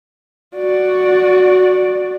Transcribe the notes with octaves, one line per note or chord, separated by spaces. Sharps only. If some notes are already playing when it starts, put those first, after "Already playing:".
F#4 D5